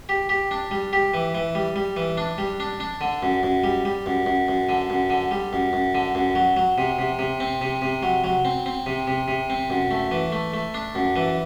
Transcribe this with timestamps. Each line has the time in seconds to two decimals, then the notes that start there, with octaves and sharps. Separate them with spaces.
0.09 G4
0.29 G4
0.51 D4
0.71 G3
0.93 G4
1.14 E3
1.35 E3
1.55 G3
1.76 G3
1.96 E3
2.17 D4
2.38 G3
2.60 D4
2.80 D4
3.01 D3
3.22 F#2
3.43 F#2
3.64 G3
3.85 G3
4.06 F#2
4.26 F#2
4.48 F#2
4.69 D3
4.90 F#2
5.10 D3
5.31 G3
5.53 F#2
5.73 F#2
5.95 D3
6.15 F#2
6.35 F#3
6.57 F#3
6.78 C3
6.98 C3
7.19 C3
7.40 C4
7.61 C3
7.82 C3
8.03 F#3
8.24 F#3
8.45 C4
8.66 C4
8.86 C3
9.07 C3
9.28 C3
9.50 C4
9.70 F#2
9.91 A3
10.11 E3
10.32 A3
10.54 A3
10.74 D4
10.95 F#2
11.16 E3